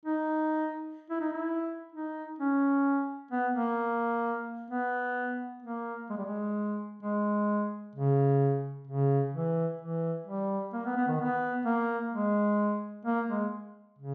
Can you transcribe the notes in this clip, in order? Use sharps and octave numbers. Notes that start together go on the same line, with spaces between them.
D#4
E4
D#4
E4
D#4
C#4
B3
A#3
B3
A#3
G#3
G3
G#3
G#3
C#3
C#3
E3
E3
G3
A#3
B3
B3
D#3
B3
A#3
G#3
A#3
G#3
C#3